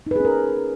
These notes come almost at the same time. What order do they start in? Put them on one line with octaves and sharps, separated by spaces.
D#4 B4 G#4 C#4 A#4